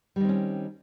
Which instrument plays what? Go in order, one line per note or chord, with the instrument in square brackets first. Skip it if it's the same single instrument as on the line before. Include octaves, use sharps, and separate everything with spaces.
[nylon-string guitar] G3
D#3
C4
C#4